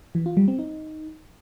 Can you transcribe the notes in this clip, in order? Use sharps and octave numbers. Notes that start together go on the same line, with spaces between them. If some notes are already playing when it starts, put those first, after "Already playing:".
E3
F4
G3
C4
D#4